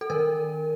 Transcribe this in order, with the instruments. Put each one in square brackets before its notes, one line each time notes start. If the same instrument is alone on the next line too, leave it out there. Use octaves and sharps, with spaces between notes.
[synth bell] A4
D#3 A#4